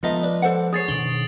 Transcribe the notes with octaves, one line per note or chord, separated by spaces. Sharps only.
F3 G#3 B3 D#4 F4 A4 D#5 E5
D4 B4
A4 C5 F#5
G#4 C#5 D#6 A6 C7
B2 D#3 D4 C6 D7 F#7 G7